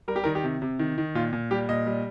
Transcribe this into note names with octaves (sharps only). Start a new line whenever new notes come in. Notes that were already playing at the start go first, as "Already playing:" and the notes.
G3 A#4
G4
D#3 A#4
G4
C3
C3
D#3
D#3
A#2 F4
A#2
G3 G4
A#2 D#5
G3